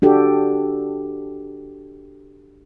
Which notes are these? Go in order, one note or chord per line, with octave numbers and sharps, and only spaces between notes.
D4 F#4 G4 A4